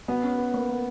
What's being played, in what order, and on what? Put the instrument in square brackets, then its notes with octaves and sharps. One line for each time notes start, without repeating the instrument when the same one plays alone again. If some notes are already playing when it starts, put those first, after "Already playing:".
[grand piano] B3 [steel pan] F#4
[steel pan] C#4
B4
A#3
A#3